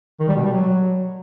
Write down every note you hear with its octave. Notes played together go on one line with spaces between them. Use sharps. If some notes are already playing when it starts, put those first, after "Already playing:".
D#3
G3
B2
G3
F#3